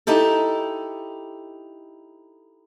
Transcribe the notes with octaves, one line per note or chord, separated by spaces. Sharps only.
D#4 E4 G4 A4